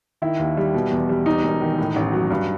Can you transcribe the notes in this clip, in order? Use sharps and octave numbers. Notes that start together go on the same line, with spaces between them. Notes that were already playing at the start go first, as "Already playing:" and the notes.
D#3 E4
D#2
G3
B2
E2
G3
E2 D#4
E1
D#3
A2
A1
F#3
G2